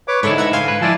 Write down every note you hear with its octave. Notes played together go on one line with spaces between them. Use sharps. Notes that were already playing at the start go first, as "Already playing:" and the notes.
B4 C#5 D6
G#2 D3 E4 G#4 A4 C#5 B5
F#5 A#5 G#6
F5 G#5 C6
B4
F3 E4 D5 G#5 A5